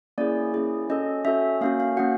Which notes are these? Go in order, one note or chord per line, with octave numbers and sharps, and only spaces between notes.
A#3 C#4 E4 G#4 D5
A#3 C#4 E4 G#4
C#4 F#4 A4 D#5
C#4 F#4 A4 E5
A#3 C#4 F#4 F5
F5
A#3 C#4 F#4 F#5